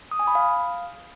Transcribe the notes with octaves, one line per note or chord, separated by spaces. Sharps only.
D#6
G#5
B5
F5